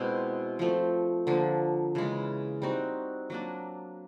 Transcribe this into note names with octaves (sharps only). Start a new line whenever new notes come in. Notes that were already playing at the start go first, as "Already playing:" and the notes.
Already playing: B2 G#3 C4 E4
F3 A3 C4
D3 F3 A#3
C#3 E3 G#3
G3 C4 D#4 F#4
F#3 A#3 D4